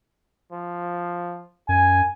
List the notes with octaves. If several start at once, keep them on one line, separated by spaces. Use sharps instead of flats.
F3
F#2 G#5